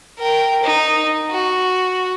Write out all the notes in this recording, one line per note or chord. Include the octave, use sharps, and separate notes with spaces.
A#4 G5
D#4
F#4